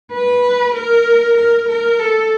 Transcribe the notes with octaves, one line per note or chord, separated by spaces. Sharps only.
B4
A#4
A#4
A#4
A4